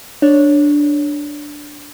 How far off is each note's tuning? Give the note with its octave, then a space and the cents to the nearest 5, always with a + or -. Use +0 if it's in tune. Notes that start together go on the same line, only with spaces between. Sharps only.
D4 +0 C#5 +0